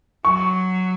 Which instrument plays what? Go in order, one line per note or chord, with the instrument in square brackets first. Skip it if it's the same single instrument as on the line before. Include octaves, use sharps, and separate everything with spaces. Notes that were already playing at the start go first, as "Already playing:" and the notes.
[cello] F#3 [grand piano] C#6